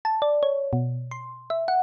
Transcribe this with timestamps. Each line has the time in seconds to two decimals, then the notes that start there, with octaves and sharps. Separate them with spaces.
0.05 A5
0.22 D5
0.43 C#5
0.73 B2
1.11 C6
1.50 E5
1.68 F#5